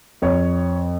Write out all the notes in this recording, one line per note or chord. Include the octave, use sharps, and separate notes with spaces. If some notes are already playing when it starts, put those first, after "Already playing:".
F2 C#5